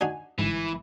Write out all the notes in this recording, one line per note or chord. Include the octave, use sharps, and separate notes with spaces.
D4 D#4 F#4 G#5
G1 G#2 E3